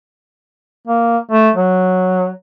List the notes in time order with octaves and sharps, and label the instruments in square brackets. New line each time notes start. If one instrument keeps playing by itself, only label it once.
[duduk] A#3
A3
F#3